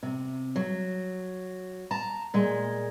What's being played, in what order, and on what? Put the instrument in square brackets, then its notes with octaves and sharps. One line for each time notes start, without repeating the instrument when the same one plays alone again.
[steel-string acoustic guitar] C3
F#3
A5 A#5
A#2 G#3